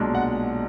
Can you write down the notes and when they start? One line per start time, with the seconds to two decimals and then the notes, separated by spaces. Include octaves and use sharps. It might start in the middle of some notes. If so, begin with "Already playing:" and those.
Already playing: B1 A#2 G#3 D4
0.15 F#5